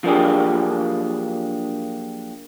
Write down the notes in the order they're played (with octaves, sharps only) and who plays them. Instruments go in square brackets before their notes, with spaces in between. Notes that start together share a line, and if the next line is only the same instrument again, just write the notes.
[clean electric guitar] F3 F#3 A#3 D4 G4 G#4